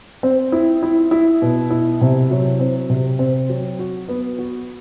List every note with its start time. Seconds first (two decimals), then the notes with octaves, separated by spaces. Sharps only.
0.23 C4
0.52 E4
0.83 E4
1.11 E4
1.42 B2
1.70 E4
2.01 C3
2.31 F#3
2.60 C4
2.90 C3
3.19 C4
3.50 F#3
3.79 F#4
4.09 B3
4.39 F#4